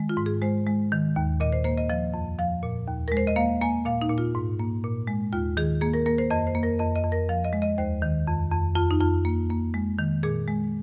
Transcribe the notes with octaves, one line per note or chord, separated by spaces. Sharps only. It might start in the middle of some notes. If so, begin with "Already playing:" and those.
Already playing: D#3 G#3
F4
G#2
G#4
G#3 C5
G#3
D#3
D#2
A#2 D#5
C5
A#3 C5
D#5
F3 D#5
F2
F3 F5
A#2
D#2
G#3 A#4
C5
D#5
A#3 F5
A#3 G#5
A#2 F5
D#4
A#2
F4
G#2
A#3
A#2
G#3
D#2 F4
D#3 G#4
A#3 G#4
A#4
A#3 A#4
C5
F2 D#5
C5
A#3
A#4
F2 D#5
D#5
F2
A#4
F3 F5
D#5
G#3
D#5
D#2 C5
D#3
F2
F2
F2 F4
D#4
F2 F4
A#3
A#3
G#3
D#3
A#2 G#4
G#3